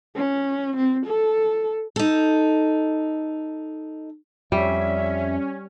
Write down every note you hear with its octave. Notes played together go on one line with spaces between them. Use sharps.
C#4
C4
A4
D#4 A4
F2 G3 C#4 E5